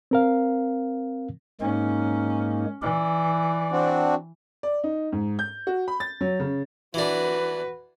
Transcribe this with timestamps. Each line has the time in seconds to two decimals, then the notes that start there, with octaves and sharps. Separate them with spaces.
0.11 C4 A#4 F5
1.61 G#2 A#3 C#4 D#4
2.82 E3 D5
3.72 C4 D4 F#4
4.63 D5
4.84 D#4
5.13 G#2
5.39 G6
5.67 F#4
5.88 B5
6.00 A6
6.21 F#3
6.40 C#3
6.94 E3 D4 F#4 B4